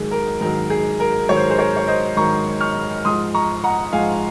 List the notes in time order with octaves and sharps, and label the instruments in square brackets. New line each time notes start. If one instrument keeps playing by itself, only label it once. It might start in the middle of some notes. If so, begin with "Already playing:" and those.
Already playing: [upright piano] G#2 D#3 F#3 G#4
A#4
G#2 D#3 F#3 A#4
G#4
A#4
G#2 D#3 F#3 C#5
C5
A#4
G#4 C5
A#4 C#5
C#5
C5 D#5
G#2 D#3 F#3 A#5 C#6
C#6 F6
G#2 F3 G#3 C6 D#6
A#5 C#6
F#5 A#5
G#2 F3 G#3 F5 G#5